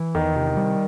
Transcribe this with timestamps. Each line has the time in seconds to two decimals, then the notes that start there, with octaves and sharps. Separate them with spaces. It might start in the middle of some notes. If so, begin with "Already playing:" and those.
Already playing: E3
0.15 E2 D#3
0.36 C3
0.57 G3